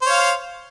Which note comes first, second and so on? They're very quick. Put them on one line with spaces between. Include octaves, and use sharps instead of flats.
C5 C#5 F5